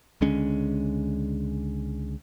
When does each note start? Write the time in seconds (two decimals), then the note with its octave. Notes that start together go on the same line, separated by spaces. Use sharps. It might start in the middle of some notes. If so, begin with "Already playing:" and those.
0.21 C#2 D3 G#3 C#4